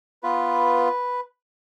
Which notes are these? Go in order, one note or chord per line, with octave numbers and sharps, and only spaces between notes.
B3 F4 B4